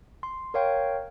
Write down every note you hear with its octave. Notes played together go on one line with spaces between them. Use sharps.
C6
A#4 C#5 F5 G5